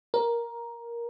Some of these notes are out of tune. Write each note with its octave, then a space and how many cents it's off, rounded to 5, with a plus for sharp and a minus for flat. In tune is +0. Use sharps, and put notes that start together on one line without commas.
A#4 +10